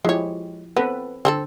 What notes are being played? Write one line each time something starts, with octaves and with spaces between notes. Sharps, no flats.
F3 G#3 E4 G4 C#5
B3 C4 A4 B4
D3 C4 G#4 A4